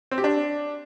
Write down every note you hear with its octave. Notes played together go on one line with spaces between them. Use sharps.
C4
G4
D4